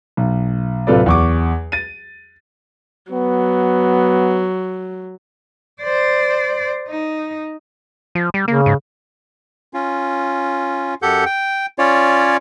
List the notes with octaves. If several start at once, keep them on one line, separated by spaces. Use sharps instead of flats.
B1
D1 C3 F4 A4 B4 D5
E2 C#6 D6
A6 D#7
F#3 B3
C5 D5
D#4
F3
G3
C#3 A#3
G#2
C#4 F4
F#2 G4 A4 F#5 G6
G5
C#4 F4 C#5 D5